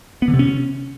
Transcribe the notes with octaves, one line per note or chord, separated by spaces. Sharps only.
B3
D3
C3
C#4